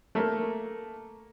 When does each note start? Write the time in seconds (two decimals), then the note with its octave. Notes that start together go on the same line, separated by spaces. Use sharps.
0.15 A3 A#3